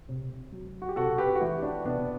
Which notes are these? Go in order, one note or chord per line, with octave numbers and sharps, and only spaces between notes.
C3
F#3
F#4
G4
C3 F#4 A4
G4 B4
F#4
E3 E4 G4
D4 F#4
C3 B3 D4